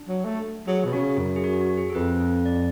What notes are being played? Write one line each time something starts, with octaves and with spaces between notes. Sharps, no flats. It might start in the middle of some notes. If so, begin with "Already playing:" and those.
Already playing: D4
F#3
A3
F#3 G#4
B2
C#3 F#4
F#2
G#4
F#4
F#4
G#4
A4
F2 B4
D5